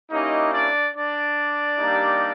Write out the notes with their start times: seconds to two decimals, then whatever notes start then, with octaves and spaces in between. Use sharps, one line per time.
0.11 A#3 C#4 D#4 E4 G4 D#5
0.53 D4 D5
0.95 D4 D5
1.77 G3 A#3 D#4 G4